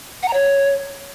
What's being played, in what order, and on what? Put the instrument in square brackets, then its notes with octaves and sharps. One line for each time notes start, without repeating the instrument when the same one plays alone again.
[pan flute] F#5
A#5
C#5